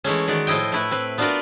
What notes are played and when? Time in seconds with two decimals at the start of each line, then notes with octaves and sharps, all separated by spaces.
0.04 E3 G#3 A3 C#4
0.28 D#3 G#3 F#4 D5
0.47 A2 F3 E4 D#5 G5
0.72 A3 E4 B4
0.91 C4 B4
1.18 B3 D4 F4 F#4 A#4 B4